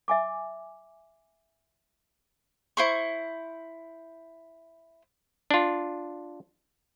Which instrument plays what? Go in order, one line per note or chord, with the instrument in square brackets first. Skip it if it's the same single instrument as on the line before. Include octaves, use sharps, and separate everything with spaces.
[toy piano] E5 G#5 D6
[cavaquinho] E4 C5 C#6
[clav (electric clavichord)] D4 F4